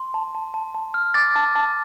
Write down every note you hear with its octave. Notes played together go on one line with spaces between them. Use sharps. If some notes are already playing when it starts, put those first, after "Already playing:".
Already playing: C6
A5
A5
A5
A5
F6
D6 A6
A5
A5